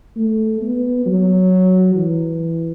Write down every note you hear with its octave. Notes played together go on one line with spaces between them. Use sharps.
A3
B3
F#3
E3